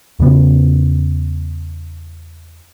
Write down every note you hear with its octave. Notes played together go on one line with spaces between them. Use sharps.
E2 C#3 B3